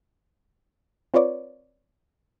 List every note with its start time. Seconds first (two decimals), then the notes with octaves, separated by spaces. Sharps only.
1.14 C4 F4 B4 C#5 D5